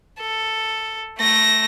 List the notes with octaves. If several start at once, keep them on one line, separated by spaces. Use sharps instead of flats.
A4
A3 A#6